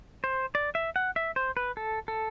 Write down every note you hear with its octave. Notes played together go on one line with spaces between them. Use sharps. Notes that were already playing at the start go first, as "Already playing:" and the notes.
C5
D5
E5
F#5
E5
C5
B4
A4
A4